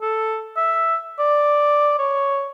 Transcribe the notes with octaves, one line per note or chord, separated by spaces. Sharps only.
A4
E5
D5
C#5